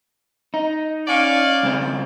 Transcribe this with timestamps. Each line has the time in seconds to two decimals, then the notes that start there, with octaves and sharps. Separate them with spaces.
0.54 D#4
1.07 C#4 D5 F5
1.63 C#2 C4